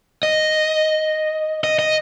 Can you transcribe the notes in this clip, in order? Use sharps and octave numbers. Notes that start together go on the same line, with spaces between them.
D#5
D#5
D#5